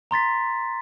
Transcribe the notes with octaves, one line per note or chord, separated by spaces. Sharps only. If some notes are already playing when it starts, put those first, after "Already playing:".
A#5 C6 A6 B6